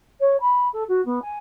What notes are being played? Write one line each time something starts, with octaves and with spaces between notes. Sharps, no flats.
C#5
B5
A4
F#4
B3
G#5